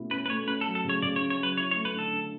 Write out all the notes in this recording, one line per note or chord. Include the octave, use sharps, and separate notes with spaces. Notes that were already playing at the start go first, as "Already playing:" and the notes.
Already playing: B2 A3 C#4 E4
C#4 B4
B4
A3 C#5
C#4 B4
A4
F#3
A4
C#3 C#5
C#3 D5
C#5
C#4
C#5
F#3 B4
E4 C#5
C#5
A3
B4
D3 A4
D3